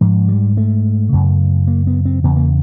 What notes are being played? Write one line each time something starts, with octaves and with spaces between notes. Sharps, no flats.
G#2 F3
G3
A3
F#2 C#3
A#3
B3
C4
E2 C#3 B3
A#3